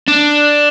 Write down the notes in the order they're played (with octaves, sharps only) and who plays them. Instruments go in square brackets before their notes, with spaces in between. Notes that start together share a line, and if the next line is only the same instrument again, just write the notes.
[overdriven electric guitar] D4